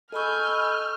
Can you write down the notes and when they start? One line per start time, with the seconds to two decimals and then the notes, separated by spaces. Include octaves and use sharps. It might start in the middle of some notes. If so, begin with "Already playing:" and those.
0.12 A4 D#5 G#5 B5 C#6 E6 F6 G6